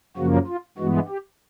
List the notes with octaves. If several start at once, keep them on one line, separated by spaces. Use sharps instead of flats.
F#2 C#3 F3 A#3 F#4
F4
G2 E3 G#3 B3 F#4
G4